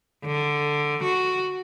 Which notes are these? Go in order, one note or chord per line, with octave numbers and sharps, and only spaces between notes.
D3
F#4